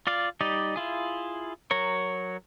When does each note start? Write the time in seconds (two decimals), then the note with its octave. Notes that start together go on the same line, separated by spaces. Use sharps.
0.07 F4 D5 F5
0.41 G3 D#4 G4 D5 D#5
0.76 E4 F4 G#4
1.71 F#3 A#4 C#5